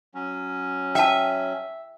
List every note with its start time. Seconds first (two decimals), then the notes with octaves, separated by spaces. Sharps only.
0.14 F#3 C#4
0.95 E5 G5 A5